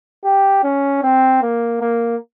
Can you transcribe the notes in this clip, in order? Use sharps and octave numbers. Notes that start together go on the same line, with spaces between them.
G4
C#4
C4
A#3
A#3